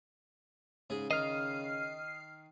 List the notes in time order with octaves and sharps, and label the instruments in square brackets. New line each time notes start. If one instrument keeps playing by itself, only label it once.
[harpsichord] G#2 G#4 [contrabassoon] C#3
[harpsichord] D#3 [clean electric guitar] D#5 [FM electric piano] F6 C7